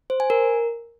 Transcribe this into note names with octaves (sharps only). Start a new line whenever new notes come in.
C5
G#5
A#4